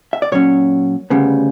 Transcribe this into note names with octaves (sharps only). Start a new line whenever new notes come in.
E5
D5
A#2 F#3 C#4 C#5
D2 C#3 G3 B3